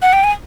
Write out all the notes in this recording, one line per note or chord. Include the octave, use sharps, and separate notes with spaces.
F#5
G5
G#5